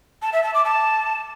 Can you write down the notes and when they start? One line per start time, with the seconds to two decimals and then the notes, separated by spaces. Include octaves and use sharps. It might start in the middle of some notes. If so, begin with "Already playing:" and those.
0.22 A5
0.33 E5
0.44 A5
0.54 D6
0.65 A5